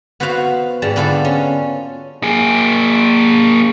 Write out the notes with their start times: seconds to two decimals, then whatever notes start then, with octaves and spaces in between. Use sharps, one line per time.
0.20 B3 F#4 B4 C5 F5
0.82 G#2 G3 A5
0.96 D3 B3 F4 A4 C5
1.25 C#4
2.23 A#3 G#4